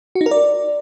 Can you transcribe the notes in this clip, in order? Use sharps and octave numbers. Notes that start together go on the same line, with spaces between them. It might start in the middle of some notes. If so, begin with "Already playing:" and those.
F#4
D#4
A#4
D5